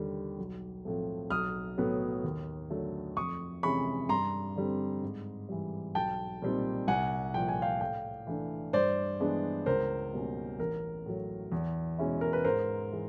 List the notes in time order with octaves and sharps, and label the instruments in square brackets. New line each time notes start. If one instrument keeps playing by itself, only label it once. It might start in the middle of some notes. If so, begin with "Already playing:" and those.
Already playing: [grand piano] D#2 D3 G3
B1
A2 F3 A3 C4
B1 D#6 F6
A2 F#3 B3
D#2
D3 F#3 A3
F2 C#6 D#6
C3 E3 G#3 C#4 B5 C#6
G2 A#5 C6
D3 G3 C4
G#2
E3 G3
B1 G5 A5
A#2 G3 C4 D#4
C2 F#5 G#5
A#2 F3 G5
G#5
F5 G5
A2 F5 G5
E3 A3 D4
G2 C5 D5
E3 G#3 B3 D4
C#2 A#4 C5
B2 G3 A#3 C#4
A1 A#4
A2 F#3
E2
B2 G#3 C#4 E4
A#4
B4
G#2 A#4 C5
E3 G#3